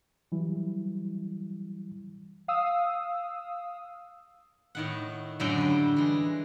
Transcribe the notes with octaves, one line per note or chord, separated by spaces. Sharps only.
E3 F#3 G3 E4
F5 D#6 E6
A2 D#3 F#5
F#2 A2 D3 D4 G5 B5
G3
E3 G#3